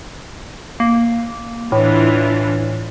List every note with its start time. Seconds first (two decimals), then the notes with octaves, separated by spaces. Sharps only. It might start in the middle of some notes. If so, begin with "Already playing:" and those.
0.80 A#3
1.72 A2 E3 D4 F4